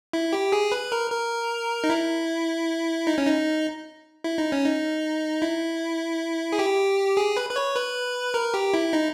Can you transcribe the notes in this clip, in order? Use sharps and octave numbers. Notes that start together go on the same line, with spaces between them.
E4
G4
G#4
B4
A#4
A#4
D#4
E4
D#4
C#4
D#4
E4
D#4
C#4
D#4
E4
G#4
G4
G#4
B4
B4
C#5
B4
A#4
G4
E4
D#4